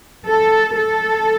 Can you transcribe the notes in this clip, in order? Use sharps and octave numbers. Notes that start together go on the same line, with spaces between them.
A4
A4